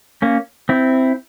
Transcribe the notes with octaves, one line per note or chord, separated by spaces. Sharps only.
A#3 C#4
C4 E4